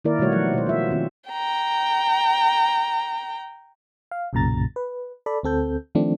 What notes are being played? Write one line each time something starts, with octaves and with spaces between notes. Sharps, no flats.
D#3 A#3 E4 A#4 D5
B2 D#3 G3 A3 F#4 C#5
F3 F#3 F#5
B2 C5
F4 E5
D#3 C4 F4
G5 A#5
F5
B1 F#2 A#2 C#3 A#5 A6
B4
A4 D5 B5
D2 C4 A4 G6
D#3 F3 A3 C4 D4